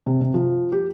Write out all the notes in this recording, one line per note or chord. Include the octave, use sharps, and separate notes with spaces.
C3
C3
F3
G4